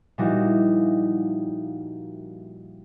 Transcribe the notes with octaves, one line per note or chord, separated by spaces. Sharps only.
A#2 F3 G3 D#4 E4 F#4